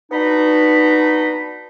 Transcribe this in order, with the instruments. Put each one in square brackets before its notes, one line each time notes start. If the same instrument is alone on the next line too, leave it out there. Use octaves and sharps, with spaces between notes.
[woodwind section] B3 D4 D#4 F#4 B5